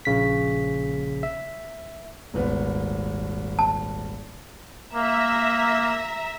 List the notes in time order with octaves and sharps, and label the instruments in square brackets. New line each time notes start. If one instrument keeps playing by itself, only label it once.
[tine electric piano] A#1 C#3 B6
E5
[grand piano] D#1 G#1 B3
[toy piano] A5
[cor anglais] A#3 [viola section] E5 A#5